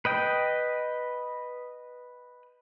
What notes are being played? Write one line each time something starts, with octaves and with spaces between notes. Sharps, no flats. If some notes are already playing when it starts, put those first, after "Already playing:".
B4 D#5 G5